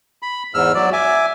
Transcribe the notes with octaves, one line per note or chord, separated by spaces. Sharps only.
B5
E2 G#2 E6 F6
F#3 D5
E5 G#5 D6